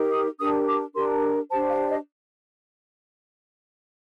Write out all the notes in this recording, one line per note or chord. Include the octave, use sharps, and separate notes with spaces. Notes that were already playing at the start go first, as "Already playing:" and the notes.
Already playing: D#4 G4 A#4
D#6
D4 G4 A#4 D#6
D6
D4 G4 A#4 C6
D4 G4 C5 A5
F5
D#5